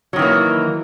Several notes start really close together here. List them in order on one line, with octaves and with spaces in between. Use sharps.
F#3 D#3 E3 A#3